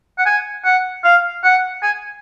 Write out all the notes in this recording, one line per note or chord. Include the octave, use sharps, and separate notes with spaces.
F#5
G#5
F#5
F5
F#5
G#5